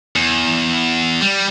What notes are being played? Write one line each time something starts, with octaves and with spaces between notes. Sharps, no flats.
E2
G3